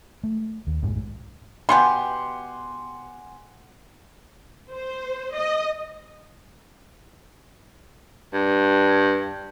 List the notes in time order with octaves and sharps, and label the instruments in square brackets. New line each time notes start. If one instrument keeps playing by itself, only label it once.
[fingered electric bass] A3
D#2
B1 F#2 A2 G#3
[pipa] B2 B3 G4 [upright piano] F#5 G#5 C6
[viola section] C5
D#5
[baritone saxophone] G2